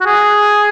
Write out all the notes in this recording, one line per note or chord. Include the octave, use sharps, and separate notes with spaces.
F#4
G#4